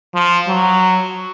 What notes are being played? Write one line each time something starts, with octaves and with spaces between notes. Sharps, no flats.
F3
F#3